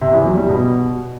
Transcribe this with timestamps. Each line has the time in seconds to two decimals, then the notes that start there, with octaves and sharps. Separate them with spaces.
0.01 C3
0.13 E2
0.25 F#3
0.37 G3
0.49 B2